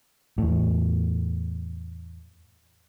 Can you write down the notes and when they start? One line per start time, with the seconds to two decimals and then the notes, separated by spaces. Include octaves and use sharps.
0.38 E2 A2